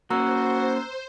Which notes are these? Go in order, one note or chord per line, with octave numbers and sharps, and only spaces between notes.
A#3 C#4 F#4 C5 A#5 E6 F#6